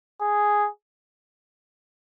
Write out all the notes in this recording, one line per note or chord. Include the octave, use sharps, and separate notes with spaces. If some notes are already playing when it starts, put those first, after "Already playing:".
G#4